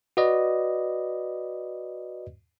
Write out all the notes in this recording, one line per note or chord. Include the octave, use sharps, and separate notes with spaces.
F#4 B4 D5 D#5